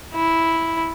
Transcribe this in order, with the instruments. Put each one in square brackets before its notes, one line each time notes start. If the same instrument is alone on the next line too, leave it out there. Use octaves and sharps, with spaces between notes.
[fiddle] E4